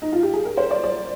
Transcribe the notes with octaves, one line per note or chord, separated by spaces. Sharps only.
D#4
F4
G4
G#4
A#4
C5
D5
D5